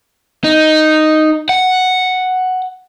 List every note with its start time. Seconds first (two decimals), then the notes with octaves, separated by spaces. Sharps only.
0.44 D#4
1.49 F#5